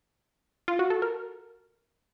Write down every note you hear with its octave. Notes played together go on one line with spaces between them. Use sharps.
F4
F#4
A4
A#4